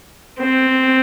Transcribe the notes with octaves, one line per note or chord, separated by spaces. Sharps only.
C4